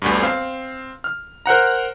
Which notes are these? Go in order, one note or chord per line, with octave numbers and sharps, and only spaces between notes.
G1 D2 G2
C4 F5
F6
A#4 C5 F#5 A#5